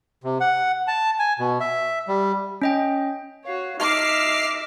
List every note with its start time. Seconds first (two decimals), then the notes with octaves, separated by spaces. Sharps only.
0.24 C3
0.41 F#5
0.87 A5
1.19 G#5
1.39 B2
1.60 E5
2.08 G3
2.62 C#4 D#5 G5
3.45 F#4 C#5 F5
3.80 D#4 D#5 E5 D6 F6 C7